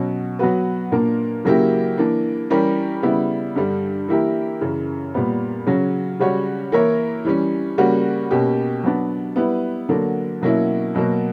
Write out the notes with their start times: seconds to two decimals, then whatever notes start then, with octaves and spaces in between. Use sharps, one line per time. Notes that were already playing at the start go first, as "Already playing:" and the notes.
Already playing: B2 F#3 C#4
0.39 F#3 B3 F#4 B4
0.92 A#2 A#3 D4 A#4
1.45 C#3 F#3 A#3 E4 G4
1.98 E3 A#3 D4
2.50 E3 G3 C#4 G4 A#4
3.03 C#3 G3 B3 E4
3.56 G2 D3 G3
4.08 E3 A#3 E4 G4 A#4
4.61 F#2 C#3 E3
5.14 A#2 G3 B3
5.67 C#3 F#3 C#4
6.19 C#3 G3 C#4 F#4 C#5
6.72 E3 A#3 E4 A#4 C#5
7.25 E3 G3 C#4
7.78 C#3 G3 A#3 C#4 F#4
8.31 B2 A#3 C#4 G4
8.83 F#3 B3 D4
9.36 G3 B3 E4 B4
9.89 D3 F#3 A#3 D4
10.42 B2 F#3 A#3 C#4 E4
10.95 B2 F#3 A#3